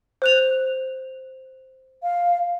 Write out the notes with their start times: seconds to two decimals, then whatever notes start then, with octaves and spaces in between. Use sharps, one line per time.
0.22 C5 F#6 F7
2.03 F5